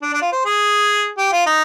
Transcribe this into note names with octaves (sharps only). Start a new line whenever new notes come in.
D4
D4
F4
C5
G#4
G4
F4
D#4